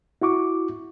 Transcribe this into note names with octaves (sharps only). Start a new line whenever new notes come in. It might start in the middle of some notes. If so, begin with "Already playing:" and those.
E4 F#4 C#6 D6